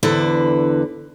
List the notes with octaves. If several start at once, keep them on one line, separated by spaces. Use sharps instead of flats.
E2 D3 E4 B4 C5